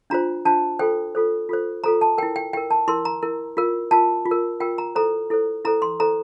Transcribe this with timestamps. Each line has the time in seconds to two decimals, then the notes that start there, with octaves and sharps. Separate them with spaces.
0.10 D4 F4 C5 A#5
0.45 D4 F4 C5 A5
0.79 F4 A4 C5 G5
1.15 F4 A4 C5
1.49 F4 A4 C5
1.84 F4 A4 C5 A#5
2.01 A5
2.18 E4 A#4 G5
2.36 G5
2.53 E4 A#4 G5
2.71 A5
2.88 E4 A#4 C6
3.05 A#5
3.23 E4 A#4
3.57 F4 A#4
3.91 F4 A#4 A5
4.26 F4
4.31 A#4
4.60 F4 A#4 G5
4.78 A#5
4.95 E4 A4 C5 A#5
5.30 E4 A4 C5
5.65 E4 A4 C5 A#5
5.82 C6
6.00 E4 A4 C5 A#5